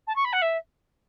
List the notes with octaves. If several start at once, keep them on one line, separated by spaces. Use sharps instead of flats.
A5
C#6
B5
F#5
E5